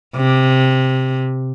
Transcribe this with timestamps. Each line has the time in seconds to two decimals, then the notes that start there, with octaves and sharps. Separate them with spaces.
0.15 C3